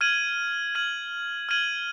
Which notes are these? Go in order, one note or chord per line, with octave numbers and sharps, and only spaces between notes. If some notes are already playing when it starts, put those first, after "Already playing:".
F6 G#6 D#7 F#7
F6 G#6 D#7 F#7
F6 G#6 D#7 F#7